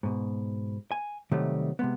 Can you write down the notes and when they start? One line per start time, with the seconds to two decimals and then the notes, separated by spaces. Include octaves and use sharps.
0.03 G#2 B2
0.92 G#5
1.32 C3 D#3 F#3 G3 A3
1.79 C3 G#3 B3